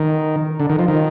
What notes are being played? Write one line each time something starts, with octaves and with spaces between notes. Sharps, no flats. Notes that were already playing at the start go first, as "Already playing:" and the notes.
Already playing: D#3
D3
D#3
F3
D#3